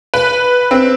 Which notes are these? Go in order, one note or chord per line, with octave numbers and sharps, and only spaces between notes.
B4
C4